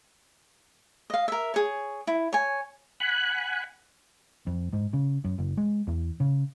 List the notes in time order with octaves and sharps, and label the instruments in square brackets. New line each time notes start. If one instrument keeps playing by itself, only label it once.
[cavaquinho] D#5 F5
A#4 E5
G#4 C#5
E4
C#5 G#5
[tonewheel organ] F#5 G#5 B5 F#6
[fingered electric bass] F2
G#2
C#3
F#2
F#1
G#3
E2
C#3